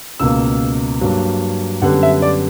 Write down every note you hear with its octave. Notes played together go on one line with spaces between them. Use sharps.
C#2 B2 A#3 E6
G2 F#3 A#3
F#2 D3 G3 B3 F#5
E5
D5